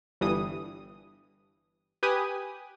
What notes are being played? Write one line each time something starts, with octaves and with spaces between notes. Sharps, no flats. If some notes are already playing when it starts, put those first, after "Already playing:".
G1 G2 E3 D#6
G4 B4 G#5 D#6